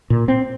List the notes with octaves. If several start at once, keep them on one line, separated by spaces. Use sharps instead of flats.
A#2
C4